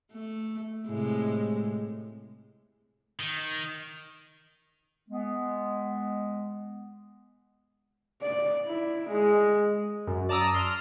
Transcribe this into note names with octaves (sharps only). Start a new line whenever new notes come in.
A3
A2 C3 G#3
D#3
G#3 B3
D5
E4
G#3
F#2
D5 A5 A#5 D#6 E6
C6 F6